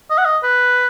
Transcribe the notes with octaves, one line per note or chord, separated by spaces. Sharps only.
D#5
F#5
D#5
B4